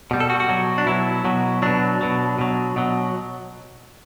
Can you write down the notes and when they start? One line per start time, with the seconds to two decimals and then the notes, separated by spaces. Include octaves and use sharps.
0.11 B2 G3
0.20 A4
0.30 F#4
0.40 F#4
0.48 B2 F#3
0.78 D4
0.86 B2 F#3 E4
1.25 B2 F#3
1.62 B2 F#3 D4
2.01 B2 F#3
2.39 B2 F#3
2.76 B2 F#3